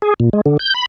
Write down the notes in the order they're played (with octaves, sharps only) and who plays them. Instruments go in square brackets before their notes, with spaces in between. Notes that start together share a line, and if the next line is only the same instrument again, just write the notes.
[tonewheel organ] G#4
A#2
G#3
D3
G6
B5